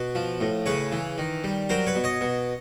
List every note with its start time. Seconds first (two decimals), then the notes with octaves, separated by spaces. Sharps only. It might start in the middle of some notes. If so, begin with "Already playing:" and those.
Already playing: B2 B4
0.15 F3
0.40 A2
0.66 C#3 B4 C#5
0.92 E3
1.18 D#3
1.44 G3
1.69 F#3 A#4 C5
1.87 B4 C#5
1.96 B2
2.04 C#5 D#5
2.21 B2